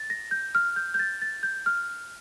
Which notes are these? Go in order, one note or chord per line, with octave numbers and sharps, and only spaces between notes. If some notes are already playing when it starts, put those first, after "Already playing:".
Already playing: A6
A#6
G6
F6
G6
G6
A6
A6
G6
F6